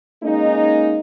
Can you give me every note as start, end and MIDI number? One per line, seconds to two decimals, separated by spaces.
0.23 0.99 56
0.23 0.99 58
0.23 0.99 61
0.23 0.99 63